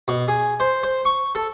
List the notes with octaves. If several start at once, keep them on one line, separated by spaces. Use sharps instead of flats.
B2
G#4
C5
C5
C#6
A4